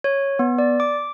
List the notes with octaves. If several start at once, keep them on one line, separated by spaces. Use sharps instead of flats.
C#5
B3
D5
D6